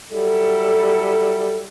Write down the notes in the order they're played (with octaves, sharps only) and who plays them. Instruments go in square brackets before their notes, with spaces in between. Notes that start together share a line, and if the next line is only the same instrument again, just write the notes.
[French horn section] F#3 G3 E4 A4